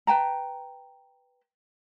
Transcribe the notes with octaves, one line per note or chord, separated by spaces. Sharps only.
B4 G5 A5 A#5